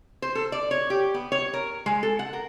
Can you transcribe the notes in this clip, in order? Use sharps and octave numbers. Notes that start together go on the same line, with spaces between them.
C5
A4
D5
C#5
G4
B3
C#5
A#4
G#3
A4
F#5
A#4